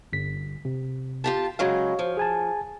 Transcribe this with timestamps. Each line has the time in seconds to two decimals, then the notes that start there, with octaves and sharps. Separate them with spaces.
0.13 G1 B6
0.65 C3
1.24 F4 G4 A5
1.59 C#3 F#3 G#3 F#4 C#5 F5
1.99 F3
2.17 G#4 G#5 A5